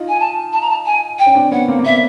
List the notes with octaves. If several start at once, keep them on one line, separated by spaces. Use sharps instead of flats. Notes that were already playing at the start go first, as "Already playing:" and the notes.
Already playing: D#4 F4
G#5
A5
A5
A#5
A5
G#5
G5
C#4
C4 D4
B3 C#4 F#5
A#3 C4
A#3
B3 E5